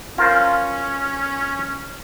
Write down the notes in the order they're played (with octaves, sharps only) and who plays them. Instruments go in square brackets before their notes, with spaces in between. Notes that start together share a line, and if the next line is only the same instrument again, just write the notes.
[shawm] C#4 [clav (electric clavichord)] F4 A#4 C5